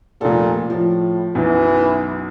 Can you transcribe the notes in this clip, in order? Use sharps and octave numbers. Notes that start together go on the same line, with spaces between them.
F1 A#2 A4
A2 F3
B1 F#2 E3